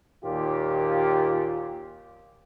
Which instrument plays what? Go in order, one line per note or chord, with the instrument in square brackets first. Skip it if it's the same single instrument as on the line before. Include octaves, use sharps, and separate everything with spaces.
[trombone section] D#2 A#2 F4 G4